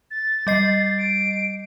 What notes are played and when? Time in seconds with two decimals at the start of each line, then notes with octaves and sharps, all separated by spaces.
0.11 A6
0.47 G3 D#5 C7
0.98 D7